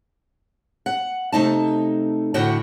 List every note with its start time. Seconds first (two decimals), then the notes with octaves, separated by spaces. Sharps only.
0.86 F#5
1.32 C3 A3 D#4 A5
2.34 D2 A2 D3 F#4 F#5 G5